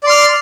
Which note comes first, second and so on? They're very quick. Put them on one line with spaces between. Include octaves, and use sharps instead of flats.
D5 C6 F6